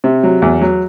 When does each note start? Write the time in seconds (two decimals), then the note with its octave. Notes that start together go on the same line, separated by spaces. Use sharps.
0.04 C3
0.23 F#3
0.42 E2
0.61 F#3